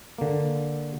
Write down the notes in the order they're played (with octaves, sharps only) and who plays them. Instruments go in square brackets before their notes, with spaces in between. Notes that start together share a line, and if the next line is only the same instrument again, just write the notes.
[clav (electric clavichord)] D3 A#3